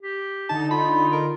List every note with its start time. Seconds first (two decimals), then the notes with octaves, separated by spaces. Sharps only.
0.02 G4
0.50 D3 D#4 A5
0.71 F4 B5
1.13 A#4